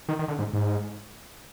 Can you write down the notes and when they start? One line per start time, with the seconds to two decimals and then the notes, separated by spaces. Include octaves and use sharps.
0.09 D#3
0.19 D#3
0.28 D3
0.39 G#2
0.54 G#2